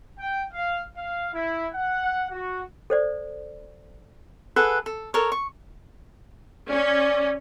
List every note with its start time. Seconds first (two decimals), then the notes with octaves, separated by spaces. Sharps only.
0.18 G5
0.53 F5
0.96 F5
1.34 E4
1.73 F#5
2.31 F#4
2.90 A4 C5 D5
4.56 G#4 A4 B4 F#5
4.86 A4
5.14 A4 A#4 C#5
5.32 C#6
6.70 C#4 D5